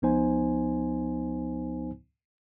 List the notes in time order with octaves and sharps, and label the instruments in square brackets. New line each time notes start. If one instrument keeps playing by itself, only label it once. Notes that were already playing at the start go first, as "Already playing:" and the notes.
[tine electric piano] C#2 F3 B3 D#4 C5 G#5